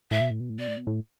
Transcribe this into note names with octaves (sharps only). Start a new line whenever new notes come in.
A2 E5
B2
A2
B2
A2
B2 D5
A2
B2
A2